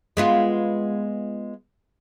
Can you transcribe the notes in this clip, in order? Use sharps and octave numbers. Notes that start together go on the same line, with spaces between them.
G#3 B3 F4